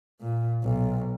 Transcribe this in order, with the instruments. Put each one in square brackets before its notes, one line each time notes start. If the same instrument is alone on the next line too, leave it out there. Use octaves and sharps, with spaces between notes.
[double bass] A#2
B1